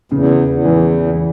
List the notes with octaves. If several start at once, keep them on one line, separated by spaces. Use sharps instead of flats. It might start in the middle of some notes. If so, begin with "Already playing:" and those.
E2 C#3
E2
E3